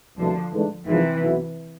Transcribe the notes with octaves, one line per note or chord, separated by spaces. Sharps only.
C2 B2 D3 F3 A3 D4
G#2 E3 A3 D4
G#1 G#2 C3 E3 F3
B1 B2 B3 E4